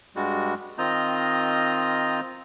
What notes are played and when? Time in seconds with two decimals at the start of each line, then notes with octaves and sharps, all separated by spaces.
0.16 G2 G3 G#3 F#4
0.78 D#3 C4 F4 D#5 A#5 G6